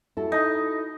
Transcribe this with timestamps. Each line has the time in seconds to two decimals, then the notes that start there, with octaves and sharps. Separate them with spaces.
0.17 E4 F#4 A4
0.32 D#4